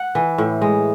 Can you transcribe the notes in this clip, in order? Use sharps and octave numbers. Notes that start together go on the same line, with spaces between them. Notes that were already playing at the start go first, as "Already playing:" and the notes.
Already playing: F#5
E3
A2
G#3